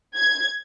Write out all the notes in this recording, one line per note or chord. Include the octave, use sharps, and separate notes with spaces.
G#6